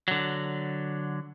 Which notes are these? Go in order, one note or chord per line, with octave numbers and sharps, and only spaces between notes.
D3 F#3